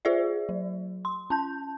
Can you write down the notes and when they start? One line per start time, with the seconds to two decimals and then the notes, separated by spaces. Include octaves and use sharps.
0.05 F4 G#4 C5 D5 E5
0.49 F#3
1.05 C6
1.30 C#4 A5 G6